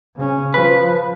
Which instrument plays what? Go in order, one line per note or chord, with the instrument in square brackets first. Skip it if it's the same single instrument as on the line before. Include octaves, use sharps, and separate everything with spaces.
[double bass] C#3 C#4
[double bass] F3 [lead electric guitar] B4